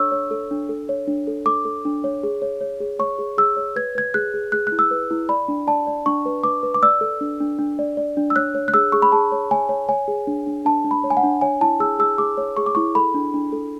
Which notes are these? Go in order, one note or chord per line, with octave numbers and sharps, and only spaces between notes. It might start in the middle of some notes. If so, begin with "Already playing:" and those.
Already playing: D4 A4 C#5 C#6 E6
C#5
A4
D4
A4
C#5
D4
A4
A4 D6
A4
D4
C#5
G#4
C#5
C#5
G#4
C#5 C#6
G#4
G#4 E6
C#5
B4 G#6
B4 G#6
G#4 F#6
G#4
G#4 F#6
F#6
E4
E6
B4
E4
D5 B5
D4
D5 A5
D5
D4 C#6
B4
B4 D6
B4
D6
D5 E6
A4
D4
D4
D4
D5
D5
D4
E6
C#5 F#6
C#5
F#6
G#4 E6
G#4 C#6
B5
G#4 A5
C#5
C#5 G#5
C#5
C#5 G#5
G#4
D4
D4
D4 A5
D4
B5
C#5
G#5
F#5
D4
C#5 G#5
E4 A5
G#4 E6
G#4 E6
G#4 D6
C#5
G#4 C#6
D6
E4 C#6
A4 B5
D4
D4
A4